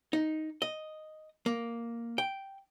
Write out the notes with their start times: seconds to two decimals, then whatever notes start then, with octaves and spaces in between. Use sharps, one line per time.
0.13 D#4
0.62 D#5
1.46 A#3
2.18 G5